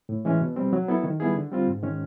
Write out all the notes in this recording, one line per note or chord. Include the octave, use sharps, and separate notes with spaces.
A2
E3 G#3 C#4
B2
G3 C4
F#3
B3 E4 A4
D#3
G3 B3 E4 G#4
D3
G3 C4 F4
G#2
D#3 G#3 C#4